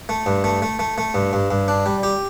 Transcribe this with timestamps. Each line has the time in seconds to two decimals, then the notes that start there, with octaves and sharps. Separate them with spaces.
0.09 A3
0.26 G2
0.44 A3
0.62 A3
0.79 A3
0.98 A3
1.15 G2
1.33 G2
1.51 G2
1.68 D4
1.86 G3
2.03 G4